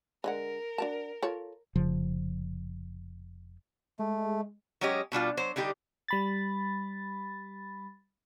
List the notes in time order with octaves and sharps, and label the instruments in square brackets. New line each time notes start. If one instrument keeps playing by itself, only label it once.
[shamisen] D3 G#3 F#5 [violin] A#4
[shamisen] D4 F#4 A5
F4 A4 C#5
[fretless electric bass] F1 C#3 F3
[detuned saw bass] G#3 [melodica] A3
[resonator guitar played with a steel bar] F#3 G#3 C#4 G4 D#5
B2 G3 D4 F4
F#3 C5
D3 G3 D#4 G4
[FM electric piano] G3 B5 A6